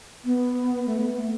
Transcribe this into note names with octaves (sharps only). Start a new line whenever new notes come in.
B3
A3
B3
A3